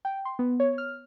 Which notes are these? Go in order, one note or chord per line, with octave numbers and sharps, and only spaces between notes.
G5
C6
B3
C#5
F6